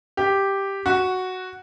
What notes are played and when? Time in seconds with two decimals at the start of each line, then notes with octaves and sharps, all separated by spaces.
0.17 G4
0.86 F#4